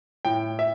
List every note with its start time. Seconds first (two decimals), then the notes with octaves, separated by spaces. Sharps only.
0.25 A2 G5
0.59 E5